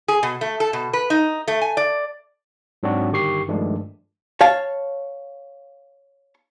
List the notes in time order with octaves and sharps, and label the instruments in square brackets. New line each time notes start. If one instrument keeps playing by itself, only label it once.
[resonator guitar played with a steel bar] G#4
B2
A3
A4
B2
B4
D#4
A3
G#5
D5
[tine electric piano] G#2 F#3 C4 D4 F#4
G1 G2 D#3 G4 C#6 C7
G2 D#3 F3 G#3 A3 D4
[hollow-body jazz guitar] C#5 F5 A5